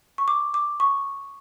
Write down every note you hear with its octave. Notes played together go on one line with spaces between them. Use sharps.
C#6
D6
D6
C#6